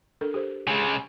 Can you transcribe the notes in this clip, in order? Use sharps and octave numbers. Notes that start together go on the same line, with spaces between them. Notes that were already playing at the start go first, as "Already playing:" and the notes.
D4 A4 A#4
G4 A4 C5
C#3 G#3